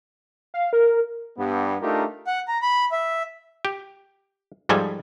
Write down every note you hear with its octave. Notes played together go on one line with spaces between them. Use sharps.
F5
A#4
G2 G3 B3
A3 D4 D#4 F4 G4 A#4
F#5
A#5
B5
E5
G4
G#2 F3 G3 A4 G#5